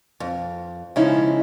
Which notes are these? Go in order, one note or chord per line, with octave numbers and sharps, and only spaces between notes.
F2
C#3 F3 G#3 C#4 D#4 E4